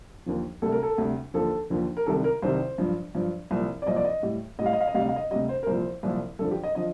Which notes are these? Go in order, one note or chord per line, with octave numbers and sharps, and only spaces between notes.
D#2 D3 F3
D2 C3 G3 A4
A#4
A4
D2 C3 G3
D#2 D3 F3 A4
D#2 D3 F3
A#4
C2 C3 D#3 G3 A4
A#4
C2 C3 D#3 G3 C5
G2 F3
G2 F3
C2 A#2 F3
D5
C2 A#2 F3 D#5
D5
D#5
A2 G3
A2 G3 D#5 F5
D#5
F5
D#5
D2 C3 G3 F5
D#5
F5
D#5
D2 C3 G3 D#5
C5
A#4
C2 A#2 F3 C5
C2 A#2 F3
G2 D3 F3 A4
G4
D#5
D3 F3 D#5